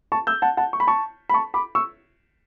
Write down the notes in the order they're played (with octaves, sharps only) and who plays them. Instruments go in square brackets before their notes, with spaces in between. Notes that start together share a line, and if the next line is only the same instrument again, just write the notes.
[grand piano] A5 C#6
E6 G6
F#5 A5
F#5 A5
C#6
B5
A5 C#6
B5
A5 C#6
B5 D6
C#6 E6